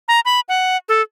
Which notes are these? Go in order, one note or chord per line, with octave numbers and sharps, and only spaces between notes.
A#5
B5
F#5
A4